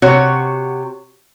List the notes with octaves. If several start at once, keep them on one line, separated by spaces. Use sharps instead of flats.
C3 F#4 C#5